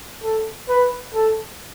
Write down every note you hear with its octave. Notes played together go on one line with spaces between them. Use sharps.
A4
B4
A4